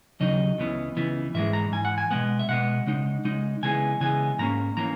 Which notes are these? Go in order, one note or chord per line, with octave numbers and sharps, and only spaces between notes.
D#2 C#3 F#3 D#4 D#5
C#2 C#3 E3 B3
C#2 C#3 E3 B3
G#2 E3 G#3 E5
A#5
G#2 E3 G#5
F#5
G#5
B2 G#3 B3 F#5
E5
B2 G#3 B3 F#5
C#3 G#3 D#4
C#3 G#3 D#4
C#3 E3 G#3 B3 G#5
C#3 E3 G#3 B3 G#5
G#2 E3 A#3 C#4 A#5
E3 A#3 C#4 A#5